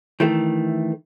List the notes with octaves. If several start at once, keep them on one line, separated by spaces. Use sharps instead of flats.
D#3 E3 A3